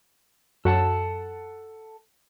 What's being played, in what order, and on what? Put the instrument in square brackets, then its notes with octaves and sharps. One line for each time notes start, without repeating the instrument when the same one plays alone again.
[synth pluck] F#2 [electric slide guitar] A4 F#5 A5